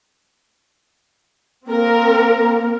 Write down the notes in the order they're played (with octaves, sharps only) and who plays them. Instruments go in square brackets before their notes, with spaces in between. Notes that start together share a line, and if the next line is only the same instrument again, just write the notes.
[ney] A#3 [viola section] C4 A#4